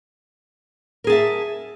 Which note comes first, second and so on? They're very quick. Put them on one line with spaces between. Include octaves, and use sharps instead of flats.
A#4 G#4 A5 E5